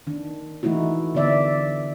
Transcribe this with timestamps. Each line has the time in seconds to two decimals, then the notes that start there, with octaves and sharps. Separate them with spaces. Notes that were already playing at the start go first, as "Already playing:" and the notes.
0.07 D#3 D4
0.63 E3 A3 D#4 E4 F#4
1.15 D3 B3 D5 E5